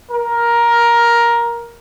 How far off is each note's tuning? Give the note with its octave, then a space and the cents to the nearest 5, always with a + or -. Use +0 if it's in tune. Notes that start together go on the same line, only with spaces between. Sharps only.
A#4 +10